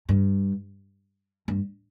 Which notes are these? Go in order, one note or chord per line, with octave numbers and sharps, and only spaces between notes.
G2
G2